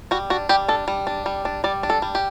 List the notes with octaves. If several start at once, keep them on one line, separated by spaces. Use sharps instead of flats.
G3 F#4
D4 F#4
G3 G4
D4 A4
G3
D4
G3
D4
G3 D5
D4
A4
G3
G4